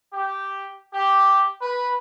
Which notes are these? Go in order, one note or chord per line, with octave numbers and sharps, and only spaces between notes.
G4
G4
B4